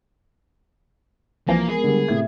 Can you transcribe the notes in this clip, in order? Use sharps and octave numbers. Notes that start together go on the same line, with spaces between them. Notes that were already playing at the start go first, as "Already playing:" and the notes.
C2 E3 F3 A#3 G#5 C7
G#3 B3 G#4 A#4
D3 G3
A2 C3 E5 G#6